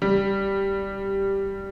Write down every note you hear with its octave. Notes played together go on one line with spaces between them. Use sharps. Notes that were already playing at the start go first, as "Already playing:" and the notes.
G3